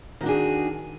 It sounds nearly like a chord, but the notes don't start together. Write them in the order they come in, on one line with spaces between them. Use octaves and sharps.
D#3 F#4 D4 G#4